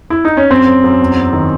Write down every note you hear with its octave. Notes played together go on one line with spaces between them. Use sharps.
E4
D#4
C#4
F#2 C4
F#2
F#2
E2
E2
D#3